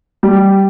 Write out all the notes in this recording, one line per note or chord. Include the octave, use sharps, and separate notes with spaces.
G3